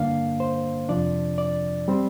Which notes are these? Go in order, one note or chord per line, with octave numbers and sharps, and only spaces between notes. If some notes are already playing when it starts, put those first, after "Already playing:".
Already playing: G2 D3 A#3 D4 F5
C5
F2 C3 F3 D4 D5
D5
G3 C4